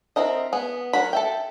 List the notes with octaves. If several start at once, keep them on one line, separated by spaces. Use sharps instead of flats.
C4 E4 A#4 D#5
B3 G#4
F#3 F#4 A#4 B5
A4 E5 G5